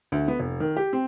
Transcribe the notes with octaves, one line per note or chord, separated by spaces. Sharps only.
D2
B3
F1
D#3
G4
C4